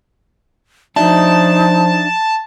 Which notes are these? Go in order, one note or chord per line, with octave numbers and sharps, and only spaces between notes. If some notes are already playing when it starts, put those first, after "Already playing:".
F3 D4 D#4 E5 A5